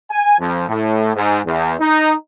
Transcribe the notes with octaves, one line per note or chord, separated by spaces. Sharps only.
G#5
F2
A2
G#2
E2
D#4